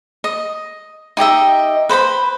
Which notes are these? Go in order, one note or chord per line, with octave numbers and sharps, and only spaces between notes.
D#5
D#4 G4 D#5 E5
B4 C5 A#5 B5